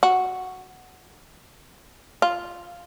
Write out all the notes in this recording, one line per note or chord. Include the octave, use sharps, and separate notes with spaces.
F#4
F4